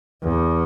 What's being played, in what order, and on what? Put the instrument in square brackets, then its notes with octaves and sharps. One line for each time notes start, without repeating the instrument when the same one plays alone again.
[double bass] E2